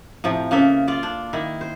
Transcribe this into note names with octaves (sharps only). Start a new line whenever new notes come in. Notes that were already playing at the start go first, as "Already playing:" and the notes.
A2 C3 F3
C#3 A#3 A4 E5
F4 D5
D4
D#3 E4
C5